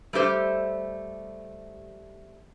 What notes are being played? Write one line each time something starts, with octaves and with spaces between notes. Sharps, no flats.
G3 A3 G4 C5